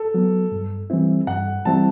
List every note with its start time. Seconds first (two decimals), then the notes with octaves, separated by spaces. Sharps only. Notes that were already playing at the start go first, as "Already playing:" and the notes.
Already playing: A4
0.14 F#3 B3
0.52 G2
0.90 E3 G3 C4 E4
1.27 G2 F#5
1.65 E3 G3 C4 E4 A5